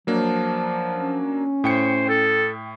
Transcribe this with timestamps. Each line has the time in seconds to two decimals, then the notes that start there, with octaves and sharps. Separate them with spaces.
0.07 F3 F#3 A#3 D4
0.94 C#4
1.64 A2 C5 G5 C#7
2.09 A4